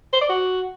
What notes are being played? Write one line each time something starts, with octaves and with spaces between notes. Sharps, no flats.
C5
D5
F#4